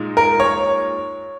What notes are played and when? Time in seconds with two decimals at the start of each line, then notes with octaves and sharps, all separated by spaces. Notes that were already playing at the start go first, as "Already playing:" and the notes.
Already playing: A#2 G#3 D#4
0.17 A#4
0.40 C#5